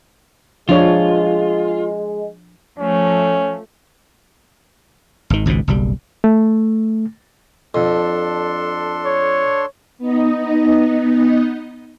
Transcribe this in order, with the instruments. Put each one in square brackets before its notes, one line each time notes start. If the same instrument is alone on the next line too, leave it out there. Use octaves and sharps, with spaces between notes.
[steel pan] F3 D4 C#5 [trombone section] G#3 [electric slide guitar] F4
[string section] F3 A3 [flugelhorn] C#4
[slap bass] G#1 D#3
G#1 C#2 G#2 B2
F#1 B1 G3
[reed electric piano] A3
[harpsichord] F2 [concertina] D4 A4 C6
[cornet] C#5
[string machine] B3 D#4 D#5